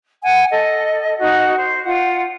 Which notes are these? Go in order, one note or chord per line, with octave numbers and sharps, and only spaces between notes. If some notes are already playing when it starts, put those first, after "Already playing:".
F#5 G#5
A4 D#5
D#4 F#4 D#5
C5
F4 F#5